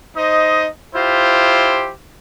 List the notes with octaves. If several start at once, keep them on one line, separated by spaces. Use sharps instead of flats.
D#4 C5 D#5
E4 F4 G4 C5